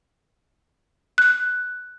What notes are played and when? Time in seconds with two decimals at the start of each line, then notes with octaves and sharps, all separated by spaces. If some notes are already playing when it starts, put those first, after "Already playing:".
1.18 F#6